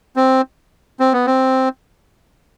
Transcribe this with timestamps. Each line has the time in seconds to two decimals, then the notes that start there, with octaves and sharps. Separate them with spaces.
0.16 C4
1.00 C4
1.13 B3
1.26 C4